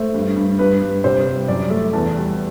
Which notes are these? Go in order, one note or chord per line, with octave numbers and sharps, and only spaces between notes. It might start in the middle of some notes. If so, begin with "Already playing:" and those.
Already playing: A3 C5
G2
G2
G2 B4
G2
C3 C5
G3
F#2 D5
A3
E2 A5
G3